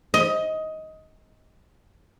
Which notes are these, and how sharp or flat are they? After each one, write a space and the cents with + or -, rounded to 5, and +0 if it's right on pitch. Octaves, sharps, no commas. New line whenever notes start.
D#5 +15